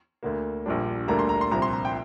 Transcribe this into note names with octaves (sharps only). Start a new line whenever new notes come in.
D2 D3 A#3
A#1 A#2 G3 D4
D2 D3 G3 A#3 D4 A#5
C6
A#5
C6
C2 A#2 F3 C4 A#5
C6
A#5
G5